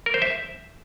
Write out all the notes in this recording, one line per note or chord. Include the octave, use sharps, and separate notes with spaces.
A#4
C5
E5